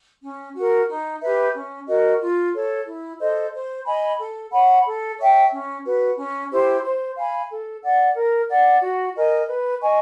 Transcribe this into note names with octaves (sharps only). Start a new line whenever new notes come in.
C#4
F#4 A#4
D#4
G4 B4 E5
C#4
F#4 A#4 D#5
F4
A4 C#5
E4
A4 C5 D#5
C5
D#5 G#5 B5
A4
C#5 F#5 B5
A4
C#5 E5 G5
C#4
F#4 B4
C#4
E4 G4 C5
C5
F5 G#5 B5
A4
D5 F#5
A#4
D5 F#5
F#4
A#4 D#5 G#5
B4
D#5 G#5 C#6